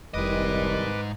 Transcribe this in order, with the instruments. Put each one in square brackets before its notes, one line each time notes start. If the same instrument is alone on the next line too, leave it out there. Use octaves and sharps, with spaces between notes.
[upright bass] F1 [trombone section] C2 D#3 G3 [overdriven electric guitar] G#2 D#5 [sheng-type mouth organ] B4 D6